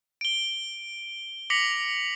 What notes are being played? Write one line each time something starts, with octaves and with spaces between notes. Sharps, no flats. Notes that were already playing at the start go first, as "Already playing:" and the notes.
D7 G7
D6 A#6 B6 C#7 F7 F#7